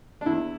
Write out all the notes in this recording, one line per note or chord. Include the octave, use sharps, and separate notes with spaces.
D4
E2 E3 E4